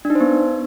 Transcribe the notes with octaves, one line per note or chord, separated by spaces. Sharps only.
D4
D#4
C5
B3